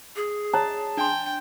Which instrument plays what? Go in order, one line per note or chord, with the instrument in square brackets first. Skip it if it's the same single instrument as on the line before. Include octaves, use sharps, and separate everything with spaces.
[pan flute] G#4
[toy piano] C#5 A#5 [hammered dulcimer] A5
[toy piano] D4 G#5 C6 [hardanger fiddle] G5